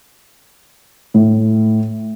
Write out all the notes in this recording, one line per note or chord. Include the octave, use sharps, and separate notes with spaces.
A2